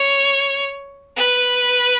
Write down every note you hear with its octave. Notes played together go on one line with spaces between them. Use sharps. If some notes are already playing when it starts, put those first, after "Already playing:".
Already playing: C#5
B4